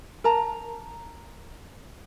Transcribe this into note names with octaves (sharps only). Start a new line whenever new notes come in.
A#4 A5 A#5